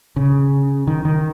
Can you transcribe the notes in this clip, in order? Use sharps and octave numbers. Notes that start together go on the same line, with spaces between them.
C#3
D#3
D#3